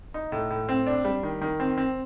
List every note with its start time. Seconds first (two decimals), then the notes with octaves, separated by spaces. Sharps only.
0.14 D#4
0.32 A2
0.50 A2
0.69 C4
0.87 D4
1.05 G3
1.23 D#3
1.42 D#3
1.60 C4
1.78 C4